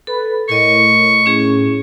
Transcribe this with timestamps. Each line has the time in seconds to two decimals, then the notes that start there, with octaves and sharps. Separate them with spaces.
0.07 A4 B4
0.49 A2 A#4 D#5 C#6
1.26 C#4 G#4